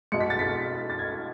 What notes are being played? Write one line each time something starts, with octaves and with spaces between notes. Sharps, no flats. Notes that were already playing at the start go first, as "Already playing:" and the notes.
B2 G#3 C#7
B6
A6
B6
A6
G#6